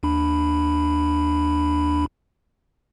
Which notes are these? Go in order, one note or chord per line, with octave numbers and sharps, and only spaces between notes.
D#2 D4 B5